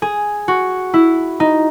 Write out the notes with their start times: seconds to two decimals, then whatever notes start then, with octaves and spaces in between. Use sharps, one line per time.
0.02 G#4
0.48 F#4
0.94 E4
1.40 D#4